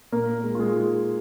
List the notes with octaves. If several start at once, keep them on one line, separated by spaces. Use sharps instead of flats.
A#2 A#3 A#4
G#3
F4
G#3 G#4
G#3